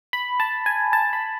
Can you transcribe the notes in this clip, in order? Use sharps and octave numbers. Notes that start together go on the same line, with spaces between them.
B5
A5
G#5
A5
B5